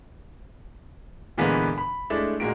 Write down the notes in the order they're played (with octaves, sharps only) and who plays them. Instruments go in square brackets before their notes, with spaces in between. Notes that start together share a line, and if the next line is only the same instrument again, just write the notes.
[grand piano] A#2 D3 E3 G#3 A#3 B3
B5
G#3 A3 D4 E4
A#2 G#3 A#3 F#4 D7